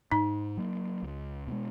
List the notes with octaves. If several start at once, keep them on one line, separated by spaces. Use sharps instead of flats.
G#2 D#4
F#3 A#3
C#2
B2 G#3